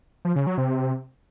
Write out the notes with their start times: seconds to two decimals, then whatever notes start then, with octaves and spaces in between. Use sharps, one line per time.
0.25 F3
0.36 C#3
0.47 F#3
0.58 C3